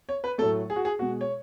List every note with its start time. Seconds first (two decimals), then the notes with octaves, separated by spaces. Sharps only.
0.09 C#5
0.24 B4
0.38 A2 F#3 A3 A4
0.70 G#4
0.76 F#4
0.85 G#4
0.99 B2 G#3 F#4
1.21 C#5